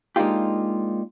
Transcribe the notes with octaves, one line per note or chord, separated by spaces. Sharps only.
G#3 A#3 D4 D#4 F4 G4